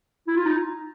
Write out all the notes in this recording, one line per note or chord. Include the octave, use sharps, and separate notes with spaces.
E4
F4
D#4